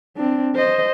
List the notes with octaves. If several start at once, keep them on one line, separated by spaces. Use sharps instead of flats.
C4 D4
C5 D#5